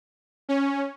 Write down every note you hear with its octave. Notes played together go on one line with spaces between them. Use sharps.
C#4